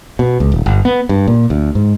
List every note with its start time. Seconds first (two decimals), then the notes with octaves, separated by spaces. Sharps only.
0.19 B2
0.40 C#2
0.52 D#1
0.66 G1
0.85 B3
1.09 G2
1.27 A#2
1.50 D2
1.75 G#2